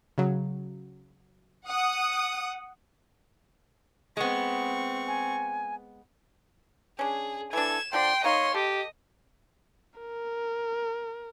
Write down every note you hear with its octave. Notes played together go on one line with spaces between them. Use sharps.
C#3 F#3
F#5 D#6
G#3 B3 C4 C#6
G#5
C#4 D4 G#4
E3 D4 A4 G#6 E7
D3 F3 D5 G5 C6
A#3 D#4 C#5 D#5 F5 C6
G4 A4 D#5
A#4